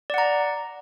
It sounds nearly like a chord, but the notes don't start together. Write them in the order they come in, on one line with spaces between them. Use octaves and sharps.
D5 F#5 A#5